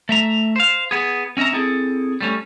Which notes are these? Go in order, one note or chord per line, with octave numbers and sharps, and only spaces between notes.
A3 E5 A#5
C5 F5
B3 G#4
C4 C#4 D#5 E5 A#5
C4 E4 G#4 A4
G3 A3 C#4